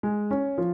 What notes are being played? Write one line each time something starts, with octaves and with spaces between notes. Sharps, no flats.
G#3
C#4
F3